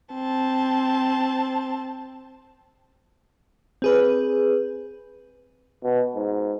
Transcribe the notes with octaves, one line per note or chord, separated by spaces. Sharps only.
C4 A5
C4 G#4 B4
B2
G#2